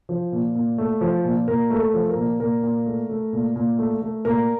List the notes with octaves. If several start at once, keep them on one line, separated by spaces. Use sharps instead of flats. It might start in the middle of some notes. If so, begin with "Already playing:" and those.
F3
A#2
A#2
A3
F3
A#2
A#2 A#4
A3 A#4
A4
F3
A#4
A#2
A#2 A#4
A#2
A3
A3
A#2
A#2
A3
A3
A#2 A#4